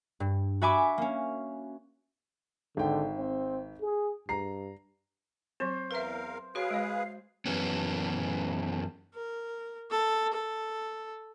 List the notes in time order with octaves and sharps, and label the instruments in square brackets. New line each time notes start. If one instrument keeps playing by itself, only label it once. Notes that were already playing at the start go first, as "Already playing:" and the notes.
[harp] G2
F#4 E5 G#5 B5 D6
A#3 C#4
[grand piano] G#1 G5 [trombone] D3
[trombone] C4
G#4
[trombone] G2 [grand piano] A#5 C7
[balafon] F#3 C4 [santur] C5
[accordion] E2 A#4 F5 [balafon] B4 E5
[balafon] F#4 C#5 [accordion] G#4 B4 [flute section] F5
[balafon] G#3 D#5
[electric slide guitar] F#2 E3 B3 C#4
[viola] A#4
A4
A4